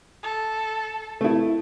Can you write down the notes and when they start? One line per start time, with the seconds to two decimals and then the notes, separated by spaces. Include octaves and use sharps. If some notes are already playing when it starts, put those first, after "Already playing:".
0.23 A4
1.21 A3 E4